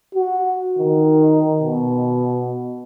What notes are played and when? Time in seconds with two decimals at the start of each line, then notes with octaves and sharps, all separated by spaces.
0.15 F#4
0.79 D#3
1.62 B2